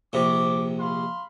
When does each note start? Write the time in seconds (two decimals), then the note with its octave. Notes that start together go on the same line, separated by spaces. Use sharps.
0.13 A#1 C3 D6
0.79 F5 B5 C6